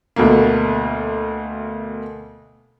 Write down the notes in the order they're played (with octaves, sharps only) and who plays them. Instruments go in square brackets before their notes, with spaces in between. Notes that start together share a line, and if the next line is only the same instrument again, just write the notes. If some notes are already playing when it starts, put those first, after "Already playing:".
[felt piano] D2 B2 A3 A#3